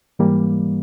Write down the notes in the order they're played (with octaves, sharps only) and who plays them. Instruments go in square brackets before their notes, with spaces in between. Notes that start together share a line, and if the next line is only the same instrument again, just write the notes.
[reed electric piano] G#2 E3 G3 A#3